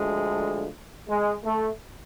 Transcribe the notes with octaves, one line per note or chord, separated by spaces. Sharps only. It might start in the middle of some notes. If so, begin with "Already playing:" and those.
Already playing: D2 D3 F3 G#3
G#3
A3